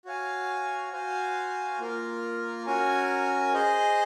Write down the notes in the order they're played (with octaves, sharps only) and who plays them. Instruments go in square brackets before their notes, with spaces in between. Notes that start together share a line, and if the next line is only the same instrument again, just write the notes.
[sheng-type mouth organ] F#4 C#5 F5 G#5
F#4 C5 F5 G#5
A#3 F4 A#4
C#4 F#4 A#4 C#5 G#5
G#4 C5 D#5